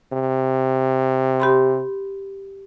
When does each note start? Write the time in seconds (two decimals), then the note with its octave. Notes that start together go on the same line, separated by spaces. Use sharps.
0.13 C3
1.40 G4 B5 C6